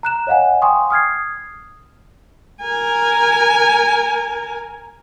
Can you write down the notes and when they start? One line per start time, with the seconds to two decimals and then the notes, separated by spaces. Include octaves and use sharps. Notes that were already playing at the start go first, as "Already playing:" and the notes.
0.03 A#5 F#6 E7
0.27 C#5 D#5 F5 F#5 G#5
0.62 G5 G#5 C6 C#6 D#6
0.90 D#6 F6 G#6 C7
2.62 A#4 G#5